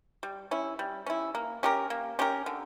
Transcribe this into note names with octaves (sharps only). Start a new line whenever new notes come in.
G3
C#4 E4
G3
C#4 E4
A#3
C#4 G4 A#4
A#3
C#4 G4 A#4
D3